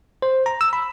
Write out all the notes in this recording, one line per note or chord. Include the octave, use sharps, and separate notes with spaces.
C5
A#5
E6
B5